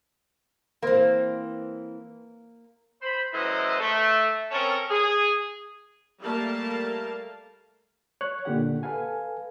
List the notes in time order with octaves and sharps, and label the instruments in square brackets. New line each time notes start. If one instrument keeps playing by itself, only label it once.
[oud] E3 C4 [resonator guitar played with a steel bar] A#3
[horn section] C5 B5
F#2 A2 E3 C5 D#5 A#5
A3
C4 C#4 A4 A#4 C#5 A5
G#4
[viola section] G3 A3 A#3 A#4 F5 A5
[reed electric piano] C#5 F#6
A#2 D3 G4 F#5
A4 B4 F5 G#5